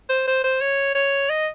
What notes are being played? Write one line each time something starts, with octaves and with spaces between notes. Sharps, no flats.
C5
C5
C5
C#5
C#5
D#5